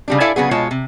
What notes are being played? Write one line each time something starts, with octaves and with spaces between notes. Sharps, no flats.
C#3 G3 D4
E4 A4 D5 E5 F5 G#5
C#3 F#3 B3 G#4
B2 G#3 F4 C#5 A5
C3